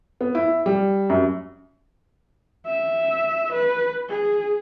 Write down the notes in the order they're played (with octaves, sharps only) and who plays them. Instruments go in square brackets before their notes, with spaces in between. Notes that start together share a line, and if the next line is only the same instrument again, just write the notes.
[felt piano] B3
E4
G3
F#2
[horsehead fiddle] E5
B4
G#4